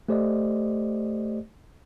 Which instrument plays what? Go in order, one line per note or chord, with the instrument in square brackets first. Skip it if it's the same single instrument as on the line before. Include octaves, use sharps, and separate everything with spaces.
[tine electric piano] A3 G4 C5 D5 D#5